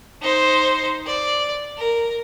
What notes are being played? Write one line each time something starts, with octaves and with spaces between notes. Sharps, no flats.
D#4 C5
D5
A#4